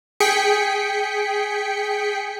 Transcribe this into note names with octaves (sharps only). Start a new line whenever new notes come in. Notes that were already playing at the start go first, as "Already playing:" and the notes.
G#4 G5 B6 C#7